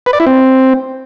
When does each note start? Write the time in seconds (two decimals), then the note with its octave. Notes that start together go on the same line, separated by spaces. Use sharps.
0.06 B4
0.13 D5
0.20 E4
0.27 C4